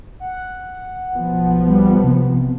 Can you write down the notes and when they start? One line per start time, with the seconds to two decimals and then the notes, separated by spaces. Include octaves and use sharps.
0.20 F#5
1.15 B1 F3 B3
1.67 G3
2.04 C3